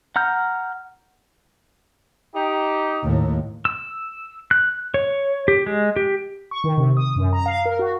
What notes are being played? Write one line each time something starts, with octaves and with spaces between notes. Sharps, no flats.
F#5 A#5 F6 G6
D#4 G4
D#2 A2
E6
F#6
C#5
G4
G#3
G4
C#6
D#3
C3
D#6
F#2
A#5
F5
A#4
F#4